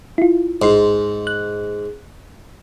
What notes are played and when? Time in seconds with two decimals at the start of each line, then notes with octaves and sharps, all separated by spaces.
0.18 E4 F4
0.62 A1 G#2 C6
1.27 F#6